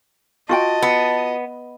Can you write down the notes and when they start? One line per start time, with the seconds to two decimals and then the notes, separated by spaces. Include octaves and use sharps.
0.49 F4 F#4 D#5 G5 A5
0.82 B3